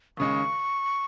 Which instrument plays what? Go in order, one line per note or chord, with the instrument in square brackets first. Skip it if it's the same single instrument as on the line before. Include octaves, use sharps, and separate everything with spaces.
[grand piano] D#2 C#3 G#3 [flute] C#6